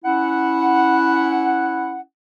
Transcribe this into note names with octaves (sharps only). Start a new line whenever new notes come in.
C#4 E4 F#5